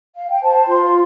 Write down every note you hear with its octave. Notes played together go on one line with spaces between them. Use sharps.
F5
G5
C5 A5
F4 C6